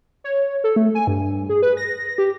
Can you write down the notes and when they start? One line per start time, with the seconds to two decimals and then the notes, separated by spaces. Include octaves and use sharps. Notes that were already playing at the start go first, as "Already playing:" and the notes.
0.24 C#5
0.64 A4
0.76 A3
0.95 G#5
1.07 G2
1.49 G#4
1.62 B4
1.77 A#6
2.18 G4